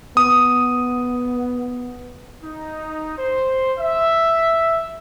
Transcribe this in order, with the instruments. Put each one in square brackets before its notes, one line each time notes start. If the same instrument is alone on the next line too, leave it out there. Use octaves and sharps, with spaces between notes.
[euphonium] B3 [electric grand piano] D#6
[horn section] D#4
C5
E5